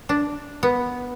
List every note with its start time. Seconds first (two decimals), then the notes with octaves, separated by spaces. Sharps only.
0.09 D4
0.63 B3